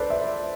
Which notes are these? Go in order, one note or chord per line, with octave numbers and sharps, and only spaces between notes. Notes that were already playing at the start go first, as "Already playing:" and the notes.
Already playing: A4 B4 C5 D5
E5